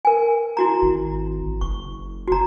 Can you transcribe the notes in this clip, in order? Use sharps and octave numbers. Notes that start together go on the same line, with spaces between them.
A#4 G#5
E4 F#4 A#5
G#1
F#1 C#6
F#4 A#5